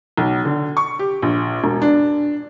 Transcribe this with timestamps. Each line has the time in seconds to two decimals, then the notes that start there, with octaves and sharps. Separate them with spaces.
0.18 B1
0.45 D3
0.77 C#6
0.99 G4
1.22 A#1
1.64 E1
1.82 D4